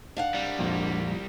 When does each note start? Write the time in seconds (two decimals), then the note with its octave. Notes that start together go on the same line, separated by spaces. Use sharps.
0.17 D4 F5 F#5
0.34 C2 G3
0.59 F2 A#2